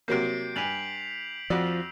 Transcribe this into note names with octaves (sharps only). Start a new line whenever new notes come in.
C3 F#3 A#3 G6 C7 D7
G2 G#5 B6 F7 F#7
F2 F3 F#4 D5 E6